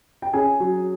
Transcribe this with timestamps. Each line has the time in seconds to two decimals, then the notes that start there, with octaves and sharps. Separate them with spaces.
0.22 G5
0.33 C#4 G#4 G#5
0.60 F#3